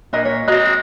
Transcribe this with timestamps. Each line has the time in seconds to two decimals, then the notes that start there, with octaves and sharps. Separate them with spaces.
0.13 A#2 D4 A#4 D#5
0.25 C#5
0.48 G#3 C4 F#4 D#5 A#5